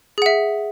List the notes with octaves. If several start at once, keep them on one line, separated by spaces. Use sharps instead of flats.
G#4 E5 F#5